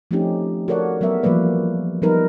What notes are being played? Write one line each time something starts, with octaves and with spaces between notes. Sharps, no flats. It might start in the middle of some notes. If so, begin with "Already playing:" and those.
F3 A3 C4 C#4 D#4 G4
F#4 A4 A#4 C#5 D5 F#5
F#3 G#3 B3 A#4 E5
E3 F3 G3 A#3 B4 D5
F3 G3 B3 D#4 A#4 B4